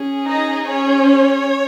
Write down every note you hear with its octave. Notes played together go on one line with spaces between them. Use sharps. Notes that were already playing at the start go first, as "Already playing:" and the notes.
Already playing: C#4 G#4
D#4 D#5
C#4 C#5